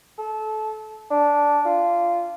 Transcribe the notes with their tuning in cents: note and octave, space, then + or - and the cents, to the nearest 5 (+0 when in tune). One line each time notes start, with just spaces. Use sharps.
A4 -25
D4 -10
F4 -15